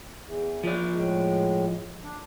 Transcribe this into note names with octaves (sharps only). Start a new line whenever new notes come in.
E2
F3 D5
A2 G#3
D4